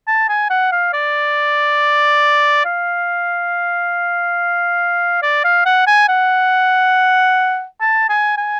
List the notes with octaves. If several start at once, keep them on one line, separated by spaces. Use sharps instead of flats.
A5
G#5
F#5
F5
D5
F5
D5
F5
F#5
G#5
F#5
A5
G#5
G#5